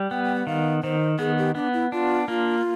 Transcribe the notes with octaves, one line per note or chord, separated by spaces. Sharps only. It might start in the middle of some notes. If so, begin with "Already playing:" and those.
Already playing: G3
B3 G5
G5
F#5
D#3 F5
D#3 C5
B3 G#4
G4
B3 D4
E4
D4 F4
A#3 F4